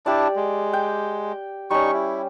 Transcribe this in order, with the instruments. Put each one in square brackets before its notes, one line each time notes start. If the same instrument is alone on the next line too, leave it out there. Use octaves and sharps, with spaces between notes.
[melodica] D4 E4 A5 [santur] G4 D5
[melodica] G#3
[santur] G5
[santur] G3 C#4 [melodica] D#4 C#6
[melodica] E4